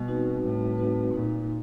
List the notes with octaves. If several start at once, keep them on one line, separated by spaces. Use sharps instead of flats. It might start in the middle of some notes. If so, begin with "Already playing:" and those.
Already playing: B2 G3
C4 D#4 F#4 B4
A2 G3
C4 D#4 F#4 B4
A#2 D#4